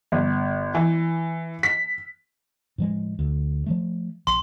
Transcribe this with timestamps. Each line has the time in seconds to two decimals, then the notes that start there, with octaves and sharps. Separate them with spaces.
0.12 G1
0.75 E3
1.63 B6
2.78 A2 F3 G#3
3.19 D2
3.67 F3 F#3 A3
4.27 A#1 C6